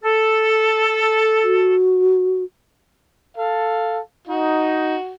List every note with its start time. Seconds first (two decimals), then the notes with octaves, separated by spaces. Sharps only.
0.03 A4
1.43 F#4
3.37 A4 F5
4.28 D#4 F#4